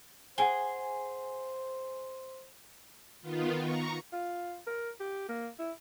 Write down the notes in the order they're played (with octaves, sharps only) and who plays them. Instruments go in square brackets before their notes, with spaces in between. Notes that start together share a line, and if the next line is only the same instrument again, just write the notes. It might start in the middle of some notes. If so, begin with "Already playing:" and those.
[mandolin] G#4 [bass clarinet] C5 [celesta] F#5 G#5 G7
[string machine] D#3 B3 F4
A#5 C#6
[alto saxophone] F4
A#4
G4
A#3
E4